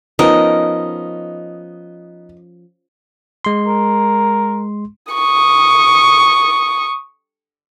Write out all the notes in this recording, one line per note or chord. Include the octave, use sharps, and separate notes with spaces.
F3 B3 C#4 D#4 A#4 D#5
G#3 C6
A#4
C#6 D#6